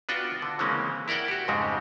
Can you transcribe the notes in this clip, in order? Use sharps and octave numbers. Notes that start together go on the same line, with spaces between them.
B3 D4 F4 F#4 F#5 G5
D3
C#3 E3 G#3 A#3 C4 C#4
E4 A#4 D5 F#5 G5
F#4 G4
F2 G#2 C#3 G3 G#3 C4